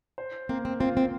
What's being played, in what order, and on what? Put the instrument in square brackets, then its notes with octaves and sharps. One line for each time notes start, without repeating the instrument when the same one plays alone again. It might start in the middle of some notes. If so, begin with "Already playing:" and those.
[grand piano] C5
[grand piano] A#3 [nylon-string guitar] C4
[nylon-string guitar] C4
[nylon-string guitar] C4 [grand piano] F4
[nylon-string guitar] C4